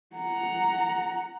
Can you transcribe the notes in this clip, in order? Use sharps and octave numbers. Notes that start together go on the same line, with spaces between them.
F#5 A#5